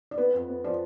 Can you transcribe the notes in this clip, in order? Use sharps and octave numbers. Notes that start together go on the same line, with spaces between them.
D5
B3 B4
F2
B3
F3 D5